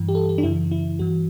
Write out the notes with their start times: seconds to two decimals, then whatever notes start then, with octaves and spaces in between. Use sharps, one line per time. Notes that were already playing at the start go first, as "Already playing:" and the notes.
Already playing: G2 E3
0.08 G4
0.15 A4
0.29 G4
0.38 D4
0.43 F#2 C#3 E3 E4
0.71 E4
0.99 G2 E3 F#4